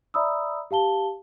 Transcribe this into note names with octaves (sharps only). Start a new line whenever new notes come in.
D5 E5 A#5 B5 D#6 E6
G4 F5 A5 G7